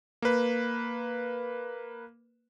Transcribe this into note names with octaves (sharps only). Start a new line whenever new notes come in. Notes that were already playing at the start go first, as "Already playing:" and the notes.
A#3 B4